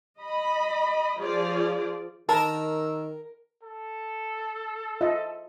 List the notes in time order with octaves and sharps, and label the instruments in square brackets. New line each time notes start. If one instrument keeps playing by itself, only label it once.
[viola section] D#5 B5
F3 F4 G#4 D5
[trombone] D#3 [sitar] A#4 [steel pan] A5 [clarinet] E6
[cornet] A4
[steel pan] F4 D#5 E5